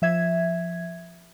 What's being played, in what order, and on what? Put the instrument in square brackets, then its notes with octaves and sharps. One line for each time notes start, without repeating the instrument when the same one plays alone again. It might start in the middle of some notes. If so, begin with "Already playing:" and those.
[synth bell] F3 E5 G#6